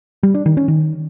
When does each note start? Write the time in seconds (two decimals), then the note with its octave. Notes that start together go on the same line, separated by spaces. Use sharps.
0.23 G3
0.34 D4
0.46 D#3
0.57 C#4
0.68 D#3